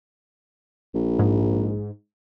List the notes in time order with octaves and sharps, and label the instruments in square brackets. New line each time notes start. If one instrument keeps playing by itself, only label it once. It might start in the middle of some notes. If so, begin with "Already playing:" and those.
[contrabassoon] A#1
[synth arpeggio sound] G#2